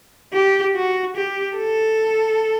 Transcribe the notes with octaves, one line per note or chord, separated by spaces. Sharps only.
G4
F#4
G4
A4